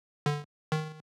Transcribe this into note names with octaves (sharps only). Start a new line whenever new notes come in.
D3
D#3